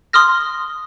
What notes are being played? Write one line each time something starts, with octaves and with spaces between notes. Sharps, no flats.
C6 D#6 F6 A#6